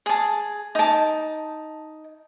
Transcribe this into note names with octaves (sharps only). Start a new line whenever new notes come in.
G#4 A5
D#4 A5